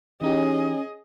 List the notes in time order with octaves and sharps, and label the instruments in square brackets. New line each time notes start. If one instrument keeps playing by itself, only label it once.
[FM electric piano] E3 D#4 G4 [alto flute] C#4 [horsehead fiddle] G#4 D#5